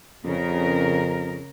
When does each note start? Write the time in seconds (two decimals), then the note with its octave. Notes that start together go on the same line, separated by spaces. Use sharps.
0.25 F2 C#3 A#4